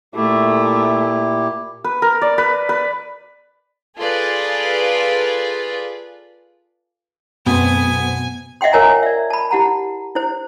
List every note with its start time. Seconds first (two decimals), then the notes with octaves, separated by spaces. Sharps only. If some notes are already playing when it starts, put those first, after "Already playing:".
0.15 A#2 A3 E4 G4
1.84 B4
2.02 A#4
2.22 D5
2.38 B4
2.69 B4
3.98 F4 G#4 A4 B4 D5 F5
7.46 F#2 B2 A3 B3 C4 G#5
8.61 D#5 E5 F#5 G5 C6
8.73 F4 A#4 C#5 G#5 A#5
9.03 D5 E5
9.30 A5 B5
9.50 E4 G4 F#5 A5 A#5
10.15 E4 C5